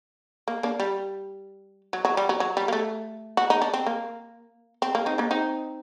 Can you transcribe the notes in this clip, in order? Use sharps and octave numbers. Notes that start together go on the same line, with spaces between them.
A#3
A#3 D4
G3
F#3
F#3
G3
F#3
F#3
G3
A#3
A3
F#4
D#4
D4
C4
A#3
C4
A#3
C4 D#4
A#3 D4
C4 D#4